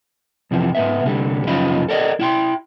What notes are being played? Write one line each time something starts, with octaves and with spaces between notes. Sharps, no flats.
F2 C3 E3 F3
G#2 B3 E5
C2 D3 G3
F#2 C#3 F3 D#4 F4 B5
A4 A#4 D5 D#5
E4 G5 C6